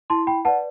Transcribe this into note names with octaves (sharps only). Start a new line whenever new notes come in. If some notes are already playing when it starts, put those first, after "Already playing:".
E4 A5 C6
G5 B5
B4 D5 F#5 A5